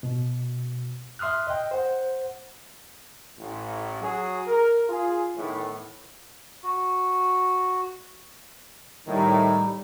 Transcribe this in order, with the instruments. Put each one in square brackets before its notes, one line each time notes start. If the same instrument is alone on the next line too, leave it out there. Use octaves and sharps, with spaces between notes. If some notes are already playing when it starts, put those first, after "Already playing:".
[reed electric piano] B2
E5 C6 D#6 F6 F#6
D#5 G5
C5 F#5
[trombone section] A1
F#3 G#4
A#4
F4 G#4
A2 D#3 E3 A3 B3
[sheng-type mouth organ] F#4
[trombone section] A2 D#3 [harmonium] G3 D#4